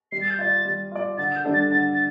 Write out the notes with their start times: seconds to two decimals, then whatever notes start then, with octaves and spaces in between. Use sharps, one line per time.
0.12 G3 C7
0.21 A6
0.30 G6
0.39 F4 D5 A6
0.65 G3
0.92 F4 D5
1.18 D3 A6
1.35 G6
1.44 G3 D4 A4
1.54 A6
1.71 D3 A6
1.94 A6